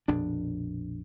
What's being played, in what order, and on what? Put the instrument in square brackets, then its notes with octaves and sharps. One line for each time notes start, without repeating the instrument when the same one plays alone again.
[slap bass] A#1 F2 B2 D4